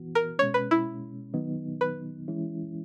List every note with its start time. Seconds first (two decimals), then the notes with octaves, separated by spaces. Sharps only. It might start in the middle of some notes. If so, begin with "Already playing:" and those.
Already playing: E3 B3 F#4
0.15 A#4
0.39 B2 G#3 C#4 C#5
0.54 B4
0.71 E4
1.34 D#3 F#3 B3 D#4
1.81 B4
2.28 E3 G#3 C#4 E4